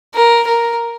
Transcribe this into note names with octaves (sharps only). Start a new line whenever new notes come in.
A#4
A#4